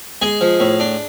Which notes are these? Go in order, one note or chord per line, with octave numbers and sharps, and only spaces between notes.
G#3 G#4 G#5
F3
A2
D4